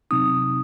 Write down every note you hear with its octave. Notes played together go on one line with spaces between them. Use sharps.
C3 F#3 C4 D#4 D#6